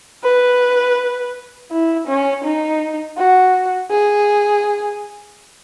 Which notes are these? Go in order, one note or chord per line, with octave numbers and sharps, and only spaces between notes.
B4
E4
C#4
D#4
F#4
G#4